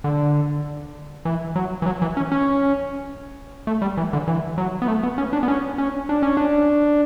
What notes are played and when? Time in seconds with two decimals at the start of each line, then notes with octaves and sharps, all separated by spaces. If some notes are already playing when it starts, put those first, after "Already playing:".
0.04 D3
1.25 E3
1.56 F#3
1.82 E3
1.86 F#3
2.02 E3
2.17 C#4
2.32 C#4
3.67 A3
3.82 G3
3.97 E3
4.13 D3
4.28 E3
4.58 F#3
4.82 B3
4.88 A3
5.03 B3
5.18 C#4
5.33 D4
5.43 B3
5.48 C#4
5.78 C#4
6.09 D4
6.22 C#4
6.37 D4